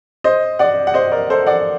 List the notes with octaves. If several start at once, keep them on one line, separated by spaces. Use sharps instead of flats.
C5 D#5
D5 F#5
F#5
C5 D#5
A#4 D5
A4 C5
D5 F#5